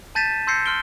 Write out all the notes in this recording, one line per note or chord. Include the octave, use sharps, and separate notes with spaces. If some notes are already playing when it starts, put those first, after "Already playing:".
A5 G6 A6 B6 D#7 E7
C6 E6 G6 A#6 C7 C#7
C6 F6 D7 G7